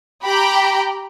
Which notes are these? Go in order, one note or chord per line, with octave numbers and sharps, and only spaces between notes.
G4 G5 A#5 B5